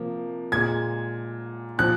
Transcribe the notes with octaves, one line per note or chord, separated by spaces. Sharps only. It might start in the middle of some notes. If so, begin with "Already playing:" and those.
Already playing: C3 F3 A#3
A#2 G#3 G#6
A#2 F3 F#6